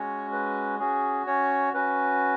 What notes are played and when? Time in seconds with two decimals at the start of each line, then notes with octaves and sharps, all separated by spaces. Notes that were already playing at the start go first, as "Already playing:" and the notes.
Already playing: G#3 C#4 F#4 C#5
0.32 B4
0.79 C#4 F#4 G#4
1.27 C#4 C#5
1.74 C#4 F#4 B4